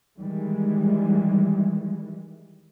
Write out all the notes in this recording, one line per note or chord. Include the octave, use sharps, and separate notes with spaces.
D#3 E3 G3 G#3